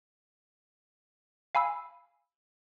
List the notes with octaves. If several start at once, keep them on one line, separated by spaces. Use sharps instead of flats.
F5 G#5 B5 E6